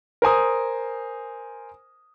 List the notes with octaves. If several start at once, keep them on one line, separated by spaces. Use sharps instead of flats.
A#4 C5 G#5 D#6